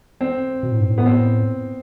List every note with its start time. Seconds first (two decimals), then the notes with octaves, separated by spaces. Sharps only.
0.21 C4
0.63 B2
0.72 A2
0.81 G2
0.90 A2
0.98 B3
1.06 C4